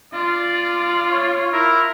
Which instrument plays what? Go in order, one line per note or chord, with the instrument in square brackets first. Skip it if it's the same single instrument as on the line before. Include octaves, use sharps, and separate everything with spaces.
[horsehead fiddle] F4 [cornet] D5
[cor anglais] C#5
[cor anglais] E4 [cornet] A#4